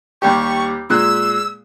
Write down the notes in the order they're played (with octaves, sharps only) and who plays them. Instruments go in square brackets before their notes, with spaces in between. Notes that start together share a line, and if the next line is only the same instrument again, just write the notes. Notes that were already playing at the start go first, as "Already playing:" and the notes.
[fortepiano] D#2 G3 G4 [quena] C#6
[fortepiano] A#2 G#3 F#6 [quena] E6